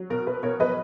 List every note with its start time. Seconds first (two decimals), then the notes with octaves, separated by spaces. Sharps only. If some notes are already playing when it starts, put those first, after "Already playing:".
Already playing: F#3
0.10 B2 A#4
0.27 B2 B4
0.43 B2 A#4 C#5
0.59 F#3 B4 D#5